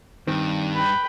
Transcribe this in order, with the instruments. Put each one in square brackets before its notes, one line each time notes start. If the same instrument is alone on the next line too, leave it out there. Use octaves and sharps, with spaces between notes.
[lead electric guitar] G2 [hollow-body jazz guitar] D#3 C4
[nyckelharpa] B4 G5